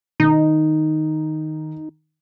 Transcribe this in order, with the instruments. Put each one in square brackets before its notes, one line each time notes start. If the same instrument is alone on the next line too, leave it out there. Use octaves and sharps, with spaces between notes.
[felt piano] D#3 [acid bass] D#4